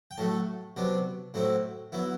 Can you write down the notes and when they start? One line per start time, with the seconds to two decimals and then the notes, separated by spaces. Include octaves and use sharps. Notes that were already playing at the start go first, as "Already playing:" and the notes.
0.11 G5
0.18 A2 F#3 A3 A5
0.76 C3 F#3 B3 D4
1.34 A2 F#3 C4 E4
1.92 F#3 B3 E4